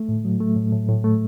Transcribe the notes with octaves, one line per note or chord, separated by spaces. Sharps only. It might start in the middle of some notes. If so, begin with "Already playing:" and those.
Already playing: A3
A2
F#3
A3
A2
A2
A2
A3